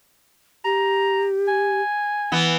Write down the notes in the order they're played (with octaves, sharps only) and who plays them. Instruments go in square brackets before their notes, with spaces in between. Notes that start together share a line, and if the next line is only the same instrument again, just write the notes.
[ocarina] G4 [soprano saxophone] A#5
[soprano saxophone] G#5
[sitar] E3 B3